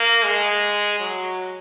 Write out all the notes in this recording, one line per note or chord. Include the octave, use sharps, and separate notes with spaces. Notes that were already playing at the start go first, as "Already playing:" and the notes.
Already playing: A#3
G#3
F#3